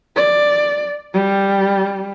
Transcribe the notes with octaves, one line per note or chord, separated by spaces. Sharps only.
D5
G3